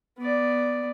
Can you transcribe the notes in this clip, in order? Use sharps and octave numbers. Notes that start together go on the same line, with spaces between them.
B3 D5